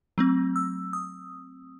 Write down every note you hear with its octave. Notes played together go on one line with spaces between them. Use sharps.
F#3 A3 C4
E6
D#6